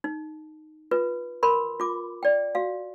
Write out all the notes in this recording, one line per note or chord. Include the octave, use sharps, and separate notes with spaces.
D#4
F4 B4
A#4 B5 C6
F4 D6
D5 G5
F#4 F5